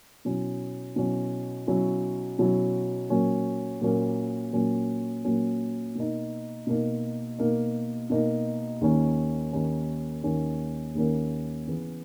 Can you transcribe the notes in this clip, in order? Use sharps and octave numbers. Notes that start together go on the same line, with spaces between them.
B2 F#3 C#4 E4
B2 F#3 C#4 E4
B2 F#3 C#4 E4
B2 F#3 C#4 E4
A#2 F#3 A#3 C#4
A#2 F#3 A#3 C#4
A#2 F#3 A#3 C#4
A#2 F#3 A#3 C#4
B2 A#3 D#4
B2 A#3 D#4
B2 A#3 D#4
B2 A#3 D#4
D#2 D#3 A#3 C#4
D#2 D#3 A#3 C#4
D#2 D#3 A#3 C#4
D#2 D#3 A#3 C#4
C#3 E3 B3